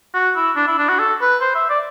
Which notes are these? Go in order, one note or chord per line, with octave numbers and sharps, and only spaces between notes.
F#4
E4
D4
E4
D4
F#4
A4
B4
C5
E5
D5